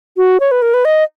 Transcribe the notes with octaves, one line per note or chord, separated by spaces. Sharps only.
F#4
C#5
B4
A#4
B4
D#5